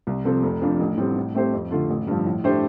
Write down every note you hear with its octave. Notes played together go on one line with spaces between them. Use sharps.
C2
C3 F3 C4 A4
F1
F2 F3 D4
A1
A2 G3 C4
A2
A3 C4 G4 C5
F2
D3 A3 F4 A4
A1
G2 F3
A2
A3 D4 G4 C5